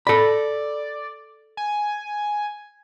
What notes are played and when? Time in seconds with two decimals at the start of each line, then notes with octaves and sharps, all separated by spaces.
0.07 A4 D5 B5
1.57 G#5